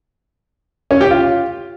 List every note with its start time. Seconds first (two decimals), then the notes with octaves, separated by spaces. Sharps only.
0.91 C#4
1.01 G4
1.11 F4